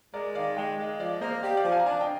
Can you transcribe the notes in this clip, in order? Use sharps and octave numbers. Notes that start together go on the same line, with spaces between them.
G#3 A#4 D5
D#3 D5 F5
G#3 D#5 G5
G#3
F3 D5 F5
A#3 C5 D#5
G4 D5 F5
D5 F5
F3
F5 G#5
A#5
D4 F5 G#5
D#5 G5